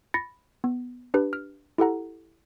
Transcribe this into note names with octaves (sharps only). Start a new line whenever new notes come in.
B5 A6 A#6 C#7
B3
D4 G4 B4
F6
E4 G4 A4 F#5 A#5